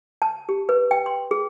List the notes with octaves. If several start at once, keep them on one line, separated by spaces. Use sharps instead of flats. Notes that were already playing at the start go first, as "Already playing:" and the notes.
A5
G4
B4
G5
C6
G#4